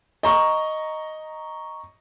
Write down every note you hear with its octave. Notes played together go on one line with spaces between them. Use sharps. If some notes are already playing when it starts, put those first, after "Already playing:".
D#5 A#5 C#6